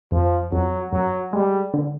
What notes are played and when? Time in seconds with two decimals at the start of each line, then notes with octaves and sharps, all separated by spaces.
0.12 F2 F3
0.52 F2 F#3
0.92 F#2 F#3
1.33 G3 G#3
1.74 D3